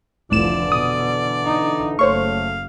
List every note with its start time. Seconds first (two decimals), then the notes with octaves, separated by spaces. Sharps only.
0.31 F1 C2 A2 D3 E3 F3 D5 E7
0.72 B2 D#6
1.45 D#4
1.99 F#1 A3 C5 C#5 F5 C#6